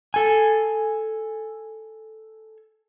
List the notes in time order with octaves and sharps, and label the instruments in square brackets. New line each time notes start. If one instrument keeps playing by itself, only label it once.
[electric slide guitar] A4 G#5